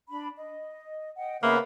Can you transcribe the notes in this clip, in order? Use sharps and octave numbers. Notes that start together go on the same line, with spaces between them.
D4 B5
D#5
D#5 F#5 G5
C#3 A#3 B3 B4 C5 E5 F5